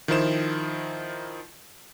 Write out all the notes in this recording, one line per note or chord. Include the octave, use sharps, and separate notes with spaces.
D#3 F3 D#4 E4 C5 E7